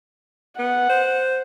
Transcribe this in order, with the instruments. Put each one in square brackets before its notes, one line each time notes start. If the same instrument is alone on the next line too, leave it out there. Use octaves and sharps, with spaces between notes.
[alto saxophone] B3 [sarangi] F#5
[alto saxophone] C5